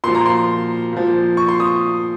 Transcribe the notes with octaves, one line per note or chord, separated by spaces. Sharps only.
A#2 F3 C6
A#5
C6
A#2 F3
C#6
C6
D#6